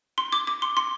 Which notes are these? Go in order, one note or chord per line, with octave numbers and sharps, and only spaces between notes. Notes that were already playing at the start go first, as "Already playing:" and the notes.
C6
D6
D6
C6
C6